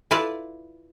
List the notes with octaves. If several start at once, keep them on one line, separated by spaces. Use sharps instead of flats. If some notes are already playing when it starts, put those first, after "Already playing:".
E4 F4 B4 D5 F5 A5